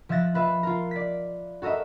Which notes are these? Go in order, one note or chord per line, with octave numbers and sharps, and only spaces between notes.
F3 E5 F#6 A6 A#6
F4 B4 E5
F4 A#4
D5 B6
F#4 A4 A#4 D#5 E5